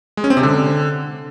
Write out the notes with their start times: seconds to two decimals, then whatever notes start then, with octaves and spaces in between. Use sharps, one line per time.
0.17 G#3
0.24 C#4
0.30 C4
0.37 C3
0.43 D3